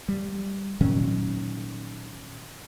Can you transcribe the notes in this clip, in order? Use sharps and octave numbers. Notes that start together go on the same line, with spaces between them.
G3
A#2 D#3 F#3 C#4